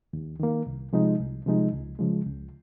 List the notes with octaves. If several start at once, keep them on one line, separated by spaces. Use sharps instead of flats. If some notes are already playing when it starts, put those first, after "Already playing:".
D#2
D#3 A#3
C2
C3 F3 G#3 D#4
C2
C3 F3 G#3 D#4
C#2
C#3 F3 G#3
C#2